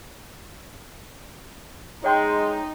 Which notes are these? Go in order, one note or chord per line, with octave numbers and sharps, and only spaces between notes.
G#3 D#4 C#5 G5 C6